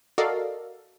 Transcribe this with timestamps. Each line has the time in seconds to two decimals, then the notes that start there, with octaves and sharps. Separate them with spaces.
0.18 F#4 A4 A#4 D5 D#5 F5